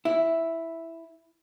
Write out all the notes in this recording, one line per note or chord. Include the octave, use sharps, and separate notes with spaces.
E4